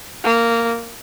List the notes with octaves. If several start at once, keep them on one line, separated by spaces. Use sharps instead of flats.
A#3